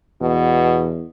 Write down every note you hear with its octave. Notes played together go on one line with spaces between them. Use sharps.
E2 B2